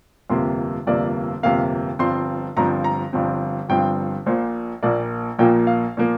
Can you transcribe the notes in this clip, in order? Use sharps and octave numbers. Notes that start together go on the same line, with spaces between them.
G1 F2 C3 A#3 C6
G1 F2 C3 A#3 D5
G1 F2 C3 A#3 F5
G1 G2 F3 C4 C6
G1 G2 F3 C4 A#5
A#5
G1 G2 F3 C4
G1 G2 F3 C4 G5
A#1 A#2 F3 A#3 C5
A#1 A#2 F3 A#3 D5
A#1 A#2 F3 A#3 G5
F5
A#2 F3 A#3